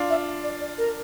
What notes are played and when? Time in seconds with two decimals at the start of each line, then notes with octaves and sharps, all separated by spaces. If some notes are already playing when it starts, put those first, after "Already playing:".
Already playing: D4 F4
0.10 E5
0.43 D5
0.61 D5
0.78 A#4